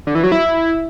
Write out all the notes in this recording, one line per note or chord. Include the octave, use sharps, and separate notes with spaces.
D3
E3
F#3
E4